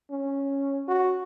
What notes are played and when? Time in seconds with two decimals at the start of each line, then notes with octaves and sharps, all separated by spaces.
0.11 C#4
0.88 F#4